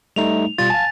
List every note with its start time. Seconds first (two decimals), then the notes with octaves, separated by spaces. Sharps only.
0.16 G3 A3 D#4 F7
0.58 B2 G3 F4 A6
0.70 F5 G#5 A5